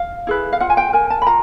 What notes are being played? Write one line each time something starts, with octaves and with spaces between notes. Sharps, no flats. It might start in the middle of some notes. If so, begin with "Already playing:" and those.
Already playing: F5
E4 G#4 B4
F5
F4 F#5
G#5
G5
A#4 G#5
A5
B5
F4 A#5